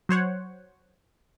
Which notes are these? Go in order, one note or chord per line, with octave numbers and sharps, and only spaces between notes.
F#3 C5 C#5 F#5